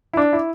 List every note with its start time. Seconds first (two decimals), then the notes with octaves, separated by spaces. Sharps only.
0.13 E4
0.17 D4
0.33 E4